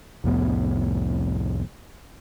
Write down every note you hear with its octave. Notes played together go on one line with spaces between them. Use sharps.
C2 F2 A2 B3